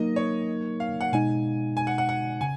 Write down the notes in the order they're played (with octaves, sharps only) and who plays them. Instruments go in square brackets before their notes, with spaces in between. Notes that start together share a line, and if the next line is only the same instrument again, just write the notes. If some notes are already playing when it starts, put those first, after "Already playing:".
Already playing: [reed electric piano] F#3 A#3 D#4 A#4 [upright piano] D#5
[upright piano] C#5
F5
F#5
[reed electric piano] B2 G#3 D#4 [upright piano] G#5
[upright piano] G#5
F#5
F#5
F#5
[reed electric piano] C#3 [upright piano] G#5